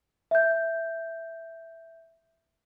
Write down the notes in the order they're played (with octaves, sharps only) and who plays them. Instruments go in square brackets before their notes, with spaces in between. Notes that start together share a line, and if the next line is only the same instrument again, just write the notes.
[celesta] E5 G6